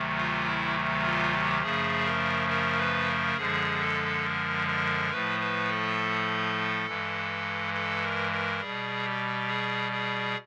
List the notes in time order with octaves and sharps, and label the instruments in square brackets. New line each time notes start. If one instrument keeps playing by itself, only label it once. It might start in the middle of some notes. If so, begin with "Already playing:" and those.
Already playing: [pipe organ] D2 C3 D#3 F#3 A3
F4
E4
F4
G4
F#2 C#3 F3 A3 G#4
A#4
A#4
B4
A#4
F#2 D3 F3 G#3 G#4
A4
A#4
A#4
A2 F3 A3 B4
B4
A4
G2 E3 G#3
A4
A#4
A#4
B2 G3 G#4
G4
G#4
G#4